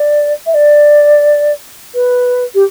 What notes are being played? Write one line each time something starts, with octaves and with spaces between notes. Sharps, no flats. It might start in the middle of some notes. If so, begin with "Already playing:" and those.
Already playing: D5
E5
D5
B4
G4